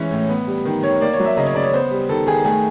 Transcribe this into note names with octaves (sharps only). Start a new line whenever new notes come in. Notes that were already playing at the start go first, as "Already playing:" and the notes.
Already playing: E3 G#3 C#4 C#5
A2
B3
G3
D#3
D#3 C#5
A#3 D5
C#5
F#3
E5
C#3 D#5
C#5
C#3 D5
C#5
B3 C5
G3
D#3 A4
D#3 G#4
A3 G#4